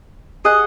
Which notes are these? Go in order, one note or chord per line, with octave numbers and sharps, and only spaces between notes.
G#4 D#5 F#5